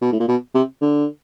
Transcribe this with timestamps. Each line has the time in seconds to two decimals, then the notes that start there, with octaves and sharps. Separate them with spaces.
0.01 B2
0.12 A2
0.20 A#2
0.28 B2
0.54 C3
0.81 D3